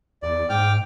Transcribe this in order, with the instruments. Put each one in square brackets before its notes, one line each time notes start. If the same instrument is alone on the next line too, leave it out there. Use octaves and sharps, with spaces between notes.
[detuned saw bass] E2 [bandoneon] D5
[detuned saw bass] G#2 [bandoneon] G5 D6 F6